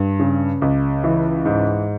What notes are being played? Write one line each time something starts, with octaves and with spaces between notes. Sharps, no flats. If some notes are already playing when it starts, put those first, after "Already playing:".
Already playing: G2
C#3
C#2
E3
G#2